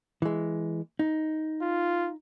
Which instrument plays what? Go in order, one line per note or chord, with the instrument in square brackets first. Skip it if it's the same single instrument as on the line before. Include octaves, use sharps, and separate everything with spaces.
[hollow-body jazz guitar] E3 G#3
D#4
[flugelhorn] F4